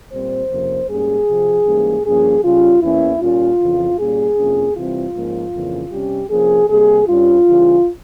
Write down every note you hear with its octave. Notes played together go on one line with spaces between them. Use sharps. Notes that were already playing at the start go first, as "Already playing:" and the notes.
A#2 G3 C4 C5
F2 C3 F3 A#3 C#4
G#2 G3 A#3 C#4 G#4
C3 F3 C4
G#2 E3 G3 A#3 C#4
G2 F3 A#3 C#4 G#4
C#3 G3 C#4 F4
E2 E3 A#3 C#4 E4
A#2 G3 A#3 C#4 F4
F2 C#3 E3
A#2 G3 A#3 C#4 G#4
F2 C3 F3 A#3 C#4
C3 E3 G3 C4 F4
G#2 F3 A#3 C#4
F2 C#3 E3 A#3 C#4
C3 G3 C#4 G4
C3 F3 A#3 C#4 G#4
C3 G3 A#3 G#4
G2 G3 C#4 F4
C#3 E3 G3